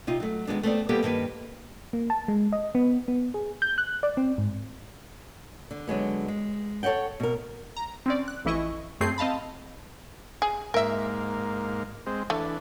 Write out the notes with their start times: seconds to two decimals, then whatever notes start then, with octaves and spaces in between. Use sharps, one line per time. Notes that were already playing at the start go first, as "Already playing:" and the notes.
0.07 C3 D#4 F4
0.20 F#3 A3
0.47 D#3 E3 G#3 B3 D4
0.63 A3 B3 C4 D5
0.89 G3 A#3 B3 G4 A4
1.03 G2 D#3 A#3 B4
1.93 A#3
2.10 A5
2.28 G#3
2.52 D#5
2.75 B3
3.08 B3
3.34 G#4
3.62 G6
3.78 F#6
4.03 D5
4.17 C4
4.38 G#2
5.71 D3
5.88 D3 F#3 G#3 B3
6.28 G#3
6.83 A4 C#5 D#5 F#5 G5
7.20 B2 A#4
7.77 A#5
8.06 C4 C#4 D5
8.28 F#6
8.45 A1 F2 E3 E4 D#5 C#6
9.01 F#2 A3 C4 G#4 G6 C7
9.18 C4 D#5 F5 A5 B5
10.42 G#4
10.74 G#2 A#3 A#4 E5
12.06 G#3 C4
12.30 E3 A3 D4